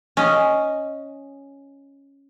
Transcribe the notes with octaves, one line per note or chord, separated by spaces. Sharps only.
C#4 D#5